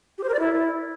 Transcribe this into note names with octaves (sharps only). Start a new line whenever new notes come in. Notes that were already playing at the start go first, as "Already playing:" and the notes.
G4
C5
A#4
D5
E4